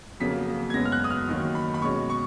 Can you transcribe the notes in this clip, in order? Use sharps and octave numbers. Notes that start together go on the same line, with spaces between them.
F2 C#3 F#3 A#3 B6
G#6
F#2 C#3 G#3 B3 A#6
F6
F#6
D#6
F6
D#2 D#3 F#3
B5
B5
B2 G#3 C#4 C#6
C#6